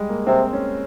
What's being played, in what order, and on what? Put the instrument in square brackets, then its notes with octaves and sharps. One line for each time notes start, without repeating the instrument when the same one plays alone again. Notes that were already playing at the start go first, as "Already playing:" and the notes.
Already playing: [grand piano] G3 G#3
A#3
[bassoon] C3 [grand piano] C4
[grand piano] C#4